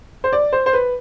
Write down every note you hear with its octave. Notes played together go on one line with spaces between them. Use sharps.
C5
D5
C5
C5
B4